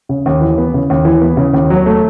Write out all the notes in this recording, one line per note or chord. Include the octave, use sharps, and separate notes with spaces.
C#3
D#2
E3
B3
C#3
D#2
E3
B3
C#3
D#2
F#3
A3